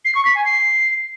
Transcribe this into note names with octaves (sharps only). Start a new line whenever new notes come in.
C7
C#6
B6
G#5
C7